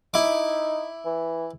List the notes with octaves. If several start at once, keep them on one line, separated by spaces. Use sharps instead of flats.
D#4 E4 D6
E3